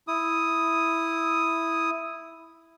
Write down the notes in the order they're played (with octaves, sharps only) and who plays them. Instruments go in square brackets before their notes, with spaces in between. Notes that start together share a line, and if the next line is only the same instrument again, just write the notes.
[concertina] E4 D#6